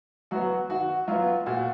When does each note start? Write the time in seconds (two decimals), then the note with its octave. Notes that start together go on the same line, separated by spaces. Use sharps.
0.31 F#3 B3 F#4
0.70 D#3 F#4
1.08 F#3 B3 F4
1.46 A#2 F#4